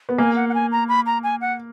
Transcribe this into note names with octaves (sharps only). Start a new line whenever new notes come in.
B3
A#3 G#5
F#5
F#5
G#5
A#5
B5
A#5
G#5
F#5